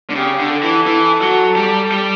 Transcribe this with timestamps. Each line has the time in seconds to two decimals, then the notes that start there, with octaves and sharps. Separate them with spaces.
0.10 D3
0.15 C#3 G4
0.40 D3
0.51 A4
0.63 E3
0.86 E3
1.21 F#3
1.56 G3
1.92 G3